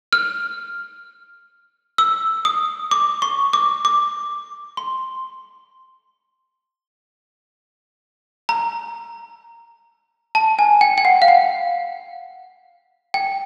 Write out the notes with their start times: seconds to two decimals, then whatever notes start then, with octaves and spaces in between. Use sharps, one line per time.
0.13 F6
1.98 E6
2.45 D#6
2.91 D6
3.22 C#6
3.53 D6
3.85 D6
4.77 C6
8.49 A#5
10.35 A5
10.59 G#5
10.81 G5
10.98 G5
11.05 F#5
11.22 F5
11.28 F#5
13.14 G5